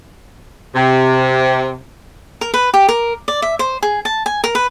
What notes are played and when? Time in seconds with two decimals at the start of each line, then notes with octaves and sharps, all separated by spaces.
0.75 C3
2.41 A#4
2.54 B4
2.74 G4
2.89 A#4
3.28 D5
3.42 E5
3.59 C5
3.83 G#4
4.05 A5
4.26 G#5
4.44 A#4
4.55 B4